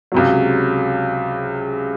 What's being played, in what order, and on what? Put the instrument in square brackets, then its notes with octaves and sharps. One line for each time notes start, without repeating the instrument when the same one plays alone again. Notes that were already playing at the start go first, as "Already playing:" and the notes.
[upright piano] C#2 C3 F#3